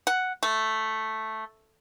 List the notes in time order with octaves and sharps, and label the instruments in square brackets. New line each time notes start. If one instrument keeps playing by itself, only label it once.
[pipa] F#5
A3